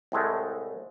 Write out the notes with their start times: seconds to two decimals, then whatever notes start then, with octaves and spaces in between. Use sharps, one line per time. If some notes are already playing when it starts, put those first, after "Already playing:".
0.12 C2 A2 G#3 A3